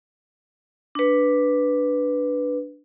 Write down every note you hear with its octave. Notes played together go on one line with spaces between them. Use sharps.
D4 B4